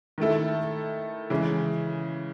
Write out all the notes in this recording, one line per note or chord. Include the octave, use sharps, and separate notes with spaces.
D#3 A3 E4 A4
C#3 E3 G#3